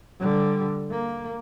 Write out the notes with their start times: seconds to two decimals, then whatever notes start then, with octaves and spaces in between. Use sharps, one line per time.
0.19 D3 G3
0.91 A#3